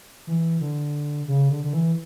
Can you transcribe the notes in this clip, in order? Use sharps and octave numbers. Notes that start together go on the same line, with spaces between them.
E3
D3
C#3
D3
D3
E3